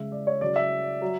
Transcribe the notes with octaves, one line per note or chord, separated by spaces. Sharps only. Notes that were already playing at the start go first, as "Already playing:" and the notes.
Already playing: C#3 G#3 E5
D5
C#5
C#3 F#3 D5
E5
F#3